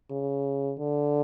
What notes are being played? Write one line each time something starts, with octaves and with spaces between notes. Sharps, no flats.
C#3
D3